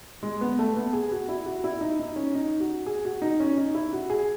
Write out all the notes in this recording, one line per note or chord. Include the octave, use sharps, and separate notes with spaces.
G#3
B3
A3
B3
G#4
F#4
E4
F#4
E4
D#4
D#4
C#4
D#4
F#4
G#4
F#4
D#4
C#4
D#4
E4
F#4
G#4